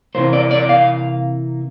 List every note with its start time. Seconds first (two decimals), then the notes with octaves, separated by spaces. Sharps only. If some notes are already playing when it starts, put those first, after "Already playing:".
0.15 C3 E3 A#3 C5
0.33 D5
0.51 D5
0.69 F5